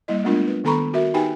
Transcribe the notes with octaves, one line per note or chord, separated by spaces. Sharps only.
G3 A#3 E4 D#5
G#3 A3 B3 D4 F4 A#4
B4
D#3 B3 A4 A#5 B5 C#6
F#4 A#4 E5
D#4 G4 B4 G5 G#5